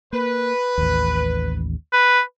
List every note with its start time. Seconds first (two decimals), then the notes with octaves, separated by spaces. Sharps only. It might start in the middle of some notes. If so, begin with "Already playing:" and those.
0.13 A#3 B4
0.78 A1 D#2
1.93 B4